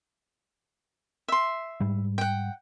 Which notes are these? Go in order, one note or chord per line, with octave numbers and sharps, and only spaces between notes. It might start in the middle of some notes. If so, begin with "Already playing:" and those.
E5 C6
G#2 G3
F#5 G5